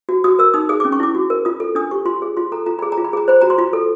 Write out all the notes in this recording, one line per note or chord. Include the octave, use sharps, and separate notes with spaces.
F#4
F#4 D#6
A#4 E6
D#4 D#6
G#4 D#6
C#4 D6
C#6
E4 D6
F#4
A#4
F4 D#6
A4
D4 D#6
G4 C#6
F4 C6
G#4
F4 C6
A4 A#5
F4 A#5
G#4 B5
A#5
F4
B5
G#4 A#5
C5 B5
F#4 A#5
C6
F4 B5
A4